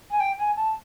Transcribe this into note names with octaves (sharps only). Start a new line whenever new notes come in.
G#5
G5
G#5
A5